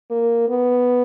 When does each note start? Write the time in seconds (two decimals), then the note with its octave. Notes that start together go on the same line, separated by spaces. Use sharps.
0.10 A#3
0.49 B3